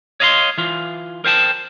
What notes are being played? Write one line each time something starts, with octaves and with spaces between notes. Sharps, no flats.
C#5 D#5 F5 A#5 C6
E3 F4
A#4 C5 G5 A5